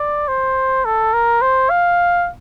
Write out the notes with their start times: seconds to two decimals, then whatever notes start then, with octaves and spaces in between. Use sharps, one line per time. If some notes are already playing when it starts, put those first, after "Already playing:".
Already playing: D5
0.28 C5
0.85 A4
1.13 A#4
1.41 C5
1.70 F5